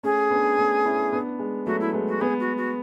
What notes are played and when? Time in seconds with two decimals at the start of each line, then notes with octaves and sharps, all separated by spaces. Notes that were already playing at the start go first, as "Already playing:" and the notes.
0.03 A3 C#4 G#4
0.31 B3 D4
0.58 A3 C#4
0.85 C#4 E4
1.13 B3 D4
1.39 G#3
1.66 F#3 A3 F#4
1.80 E4
1.93 G#3 B3
2.08 F#4
2.21 G#3 B3 G#4
2.40 F#4
2.57 F#4